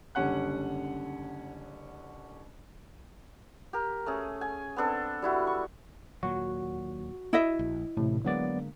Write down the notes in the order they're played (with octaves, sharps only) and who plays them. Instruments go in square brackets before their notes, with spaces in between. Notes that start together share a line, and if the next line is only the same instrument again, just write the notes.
[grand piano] F#1 D3 G3 C#4 F#5 F#6
[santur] G4 A#4
A3 C#4 G#4
G#5
B3 C4 D4 A4
G3 E4 F#4
C#6
[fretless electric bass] D#2 A#2 F#3 [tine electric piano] F#4
[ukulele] E4 D#5 E5
[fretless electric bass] A#1
[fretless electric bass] A1 [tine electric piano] A2 C3
[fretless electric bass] D3 G#3 A#3 [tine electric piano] F#3 B3 D5